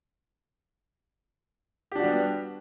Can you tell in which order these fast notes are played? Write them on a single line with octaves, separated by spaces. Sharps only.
G4 D4 F#4 G3 B3